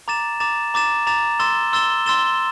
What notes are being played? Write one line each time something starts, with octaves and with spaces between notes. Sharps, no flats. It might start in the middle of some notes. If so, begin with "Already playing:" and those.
A#5 D6 A6 E7
A#5 D6 A6 E7
A#5 D6 A6 E7
A#5 D6 A6 E7
C6 E6 A6 E7 G7
C6 E6 A6 E7 G7
C6 E6 A6 E7 G7